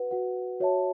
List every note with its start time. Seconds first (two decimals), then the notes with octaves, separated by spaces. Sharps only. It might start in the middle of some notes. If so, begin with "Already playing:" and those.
Already playing: F#4 B4 F#5
0.11 F#4 B4 F#5
0.60 F#4 C#5 E5 A5